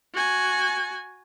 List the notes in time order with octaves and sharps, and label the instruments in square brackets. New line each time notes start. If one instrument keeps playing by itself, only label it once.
[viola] F#4 G#5